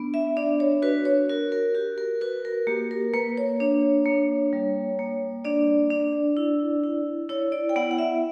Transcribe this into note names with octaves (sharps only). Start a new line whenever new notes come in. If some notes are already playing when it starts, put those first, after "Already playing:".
Already playing: B3 D4
E5
D4 D5
C#5
F#4 B4
C#5
F#4 A#4
A#4
F#4 G4
A#4
F#4 B4
A#4
A#3 G4
A#4
A#3 B4
C#5
D4 C#5
A#3
G3
A#3
D4 D5
D4
E4
E4
E4 C#5
D5
G5
B3 F#5
F#5
E5